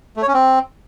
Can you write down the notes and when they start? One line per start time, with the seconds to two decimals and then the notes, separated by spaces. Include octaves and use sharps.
0.17 A3
0.22 C#5
0.28 C#4
0.34 C4